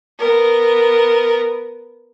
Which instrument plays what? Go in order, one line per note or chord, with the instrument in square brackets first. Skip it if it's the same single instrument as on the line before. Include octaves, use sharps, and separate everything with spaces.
[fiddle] B3 A#4